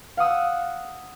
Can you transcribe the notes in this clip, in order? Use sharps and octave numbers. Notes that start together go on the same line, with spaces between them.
F5 F#5 D#6 E6